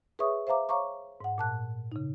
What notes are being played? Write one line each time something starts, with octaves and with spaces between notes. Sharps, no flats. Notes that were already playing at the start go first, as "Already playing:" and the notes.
G#4 B4 C#5 E5 C#6 D#6
C5 E5 F5 A#5 D6
C#5 F5 A#5 C#6 D6
G#2 F#5
A#2 A5 F#6
C#3 D#4